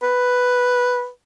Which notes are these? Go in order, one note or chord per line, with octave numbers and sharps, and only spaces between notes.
B4